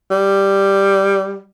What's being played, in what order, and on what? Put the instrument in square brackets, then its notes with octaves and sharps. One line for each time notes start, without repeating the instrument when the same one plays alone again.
[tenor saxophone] G3